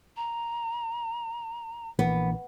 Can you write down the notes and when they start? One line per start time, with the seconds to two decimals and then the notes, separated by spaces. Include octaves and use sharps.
0.17 A#5
1.99 A#1 E3 A#3 B3